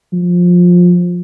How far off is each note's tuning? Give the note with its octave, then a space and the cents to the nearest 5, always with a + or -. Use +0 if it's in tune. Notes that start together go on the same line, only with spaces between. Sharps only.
F3 +20